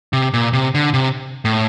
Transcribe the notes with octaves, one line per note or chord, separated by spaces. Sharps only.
C3
A#2
C3
D3
C3
A2